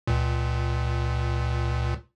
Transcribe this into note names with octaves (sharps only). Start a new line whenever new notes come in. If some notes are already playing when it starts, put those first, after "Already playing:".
C#2 A#2